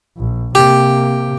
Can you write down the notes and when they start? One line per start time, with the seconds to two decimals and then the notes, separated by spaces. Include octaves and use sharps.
0.17 A#1
0.55 C3 A#3 G4